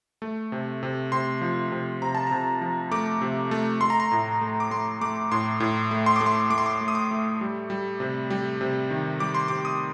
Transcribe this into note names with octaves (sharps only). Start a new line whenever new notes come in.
A3
C3
C3
C3 C6
F3
C3
C3 A#5
A5
C3 A#5
F3
A3 D6
C3
A3
A3 C6
A#5
C6
A2
A3
D6
A3 C6
A3 D6
A2 C6
A2
A3
C6
D6
A3
C6
A3 D6
C6
D6
A3
D#6
D6
A3
G3
G3
C3
G3
C3
D#3
G3 D6
C6
C3 D6
D#6